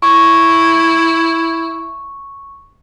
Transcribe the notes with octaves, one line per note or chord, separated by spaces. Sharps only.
E4 C#6